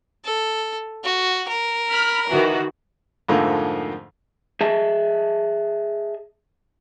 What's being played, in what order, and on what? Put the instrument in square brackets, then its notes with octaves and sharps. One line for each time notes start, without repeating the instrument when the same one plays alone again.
[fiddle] A4
F#4
A#4
[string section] B5 F6
D#3 E3 F#4
[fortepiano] F2 G#2 D3 F3 A3 A#3
[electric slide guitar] G#4 D#5 E5 A5